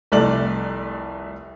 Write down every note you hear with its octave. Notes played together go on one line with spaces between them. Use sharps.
F1 C2 A3 D5 D6 F#7